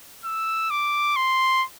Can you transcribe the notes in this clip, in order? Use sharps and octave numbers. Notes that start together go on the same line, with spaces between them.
E6
D6
C6